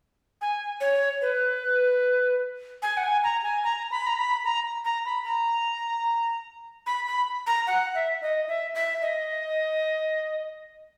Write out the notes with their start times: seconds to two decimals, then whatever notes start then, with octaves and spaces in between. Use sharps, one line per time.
0.42 G#5
0.81 C#5
1.22 B4
2.82 G#5
2.97 F#5
3.03 G#5
3.23 A#5
3.43 G#5
3.64 A#5
3.91 B5
4.07 A#5
4.18 B5
4.45 A#5
4.85 A#5
5.06 B5
5.25 A#5
6.87 B5
7.07 B5
7.47 A#5
7.67 F#5
7.95 E5
8.22 D#5
8.48 E5
8.75 E5
9.02 D#5